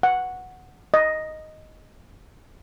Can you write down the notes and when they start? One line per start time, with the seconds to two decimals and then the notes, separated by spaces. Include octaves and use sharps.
0.03 F#5
0.94 D#5